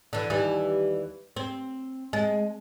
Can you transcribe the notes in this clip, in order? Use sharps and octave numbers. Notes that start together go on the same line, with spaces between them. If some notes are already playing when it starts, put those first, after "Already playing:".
D3 E3
D#2 E3 G3
C4
G#3